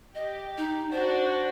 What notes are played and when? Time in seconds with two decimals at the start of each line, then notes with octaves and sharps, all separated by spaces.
0.15 G4 D#5
0.58 D#4
0.92 D4 F#4 C5